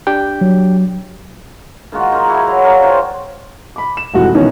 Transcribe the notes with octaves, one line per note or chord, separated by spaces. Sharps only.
D4 G4 G5
F#3
D#3 G#3 F4 F#4
D#4 A#4
E4 F#4 G#4
F#3 A#5
A#4 D5 F5 F#5
F4 C5 C#5 G5
B5 D6
E7
F1 G#2 E3 G3 F#4
B2 D#3 E3 C#4 D#4